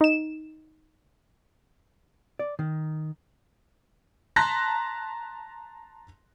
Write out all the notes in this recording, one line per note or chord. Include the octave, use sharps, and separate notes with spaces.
D#4 E7
D5
D#3
A5 A#5 C6 F#6 A#6 B6